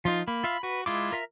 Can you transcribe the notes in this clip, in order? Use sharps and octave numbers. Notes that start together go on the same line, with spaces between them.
F3 D#4 F4
A#3 B5
F4 E5 F5
F#4 B4
G#3 E4 F4 D6
A#4 E5 A#5